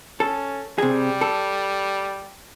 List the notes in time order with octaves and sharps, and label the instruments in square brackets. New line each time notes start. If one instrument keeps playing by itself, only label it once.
[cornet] C#4 [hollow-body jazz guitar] A4
[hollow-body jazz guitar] C3 G#4 [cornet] G3
[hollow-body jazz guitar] A4